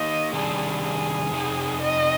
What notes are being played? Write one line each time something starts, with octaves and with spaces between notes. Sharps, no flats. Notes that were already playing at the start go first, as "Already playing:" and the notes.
Already playing: D#3 A#3 D#4 D#5
C3 D#3 G3 D4 G#4
G#4
F2 C3 D#4
D#5